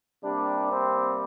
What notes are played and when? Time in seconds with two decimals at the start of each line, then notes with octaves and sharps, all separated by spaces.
0.23 C3 G3 A#3 D4
0.71 C4